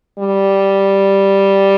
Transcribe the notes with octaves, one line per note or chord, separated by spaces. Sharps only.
G3